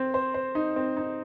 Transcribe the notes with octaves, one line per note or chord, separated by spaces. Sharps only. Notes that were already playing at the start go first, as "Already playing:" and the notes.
Already playing: C4 C5
C5
C5
D#4
C4
D#4